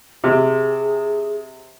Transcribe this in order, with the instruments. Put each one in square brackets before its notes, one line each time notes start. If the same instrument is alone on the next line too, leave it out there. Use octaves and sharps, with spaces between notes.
[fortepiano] C3 [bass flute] G#4